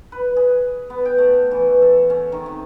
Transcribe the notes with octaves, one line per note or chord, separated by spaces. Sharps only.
B4
G#4
B3
G5
A3
E3
A4
C#4
D#3
C3